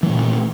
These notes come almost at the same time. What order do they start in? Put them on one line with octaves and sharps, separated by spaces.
E3 A3 A#2